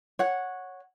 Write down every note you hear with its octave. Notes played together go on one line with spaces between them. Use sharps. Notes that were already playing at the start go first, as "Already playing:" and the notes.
C#5 F#5